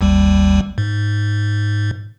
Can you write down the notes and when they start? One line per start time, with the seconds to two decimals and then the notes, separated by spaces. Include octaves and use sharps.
0.01 G#1 D#2 G3
0.78 G#2